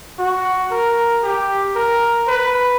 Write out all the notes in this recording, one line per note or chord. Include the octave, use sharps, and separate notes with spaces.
F#4
A#4
G4
A#4
B4